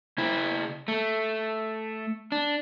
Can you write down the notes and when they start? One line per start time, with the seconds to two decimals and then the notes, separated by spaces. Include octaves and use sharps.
0.18 C#3 E4
0.88 A3
2.32 D4